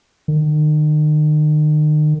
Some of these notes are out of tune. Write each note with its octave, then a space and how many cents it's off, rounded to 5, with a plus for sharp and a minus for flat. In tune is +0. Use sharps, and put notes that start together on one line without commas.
D#3 -40